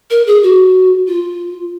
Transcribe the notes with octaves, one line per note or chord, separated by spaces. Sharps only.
A#4
G#4
F#4
F4